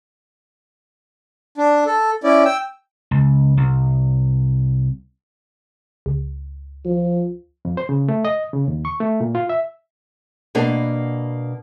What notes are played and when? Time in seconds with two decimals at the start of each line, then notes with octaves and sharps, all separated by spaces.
1.58 D4
1.86 A4
2.24 C#4 E4 D5
2.45 G5 E6
3.11 C#2
3.57 C2
6.06 C#2
6.85 F3
7.65 F2
7.77 C5
7.89 C#3
8.08 A3
8.25 D#5
8.53 C#3
8.68 D#2
8.85 C#6
9.00 A3
9.20 A#2
9.35 F4
9.49 E5
10.55 B2 A#3 B3 D4